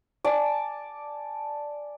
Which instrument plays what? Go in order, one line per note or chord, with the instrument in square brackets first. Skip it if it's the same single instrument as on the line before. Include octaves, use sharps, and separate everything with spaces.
[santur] D5 G#5 A5